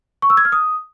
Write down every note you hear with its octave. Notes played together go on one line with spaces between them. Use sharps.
C#6
E6
G#6
F6
D#6